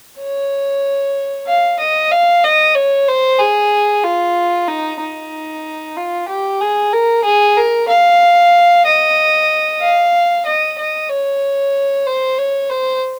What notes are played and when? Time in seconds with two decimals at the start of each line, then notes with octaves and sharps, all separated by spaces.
0.20 C#5
1.47 F5
1.80 D#5
2.11 F5
2.44 D#5
2.75 C#5
3.08 C5
3.40 G#4
4.04 F4
4.68 D#4
5.00 D#4
5.97 F4
6.29 G4
6.61 G#4
6.93 A#4
7.24 G#4
7.57 A#4
7.89 F5
8.86 D#5
9.81 F5
10.46 D#5
10.78 D#5
11.10 C#5
12.07 C5
12.38 C#5
12.70 C5